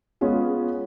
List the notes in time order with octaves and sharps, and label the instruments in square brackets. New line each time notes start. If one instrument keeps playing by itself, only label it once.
[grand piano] G#3 B3 C#4 F4 G#4